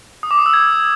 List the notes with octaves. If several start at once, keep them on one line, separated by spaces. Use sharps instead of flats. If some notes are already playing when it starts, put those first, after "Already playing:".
D#6
D6
D#6
E6
G#6